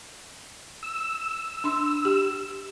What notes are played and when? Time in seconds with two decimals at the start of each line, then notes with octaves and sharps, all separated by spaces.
0.83 E6
1.64 D4 C6
2.05 G4